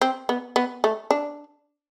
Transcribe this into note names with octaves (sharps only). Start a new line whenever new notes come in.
C4
B3
B3
A3
D4